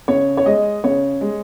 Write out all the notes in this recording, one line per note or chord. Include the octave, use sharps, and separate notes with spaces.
C#3 C#5
C#5
G#3 D#5
C#3 C#5
G#3